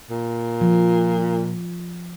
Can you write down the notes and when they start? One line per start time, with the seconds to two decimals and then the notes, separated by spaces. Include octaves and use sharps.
0.10 A#2
0.61 F3